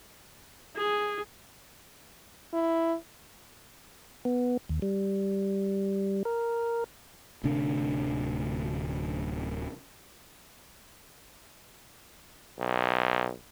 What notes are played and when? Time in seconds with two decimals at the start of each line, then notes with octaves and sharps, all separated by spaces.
0.77 G#4
2.53 E4
4.25 B3
4.69 D#2
4.82 G3
6.25 A#4
7.44 D1 D2 C3 D4
12.59 B1